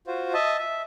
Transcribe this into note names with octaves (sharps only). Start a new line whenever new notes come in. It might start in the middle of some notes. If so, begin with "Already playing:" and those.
F4 F#4 C5
D#5 E5 A5
E5